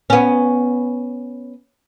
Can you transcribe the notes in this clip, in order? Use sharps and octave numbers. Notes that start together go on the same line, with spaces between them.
B3 C#4